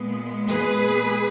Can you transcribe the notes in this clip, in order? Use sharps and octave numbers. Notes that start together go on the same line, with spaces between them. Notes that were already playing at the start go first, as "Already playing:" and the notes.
Already playing: A#2 G#3 B3
G#4 B4